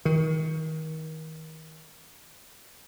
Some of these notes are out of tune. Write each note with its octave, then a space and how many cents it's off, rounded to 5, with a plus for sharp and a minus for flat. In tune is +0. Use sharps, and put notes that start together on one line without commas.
D#3 +30